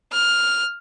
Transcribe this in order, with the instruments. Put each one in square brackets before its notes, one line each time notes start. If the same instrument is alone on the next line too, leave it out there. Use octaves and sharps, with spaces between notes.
[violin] F6